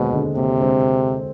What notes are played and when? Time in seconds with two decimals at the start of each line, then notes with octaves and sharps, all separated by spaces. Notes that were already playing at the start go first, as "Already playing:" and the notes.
Already playing: D#2 B2 D3 G#3 C4
0.13 D3 G#3 C4
0.36 D#2 C3
0.59 D3 G#3 C4